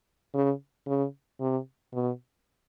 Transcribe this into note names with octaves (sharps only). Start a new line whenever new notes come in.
C#3
C#3
C3
B2